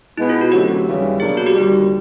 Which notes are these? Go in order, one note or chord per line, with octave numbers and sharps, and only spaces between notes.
B2 G#3 B3 E4
F4
F#4
F#2 D3 F#3 A3 C4 G4
D#2 C#3 E3 G3
B2 F#3 A#3 D4 G#4
F#4
G4
D#2 D3 G3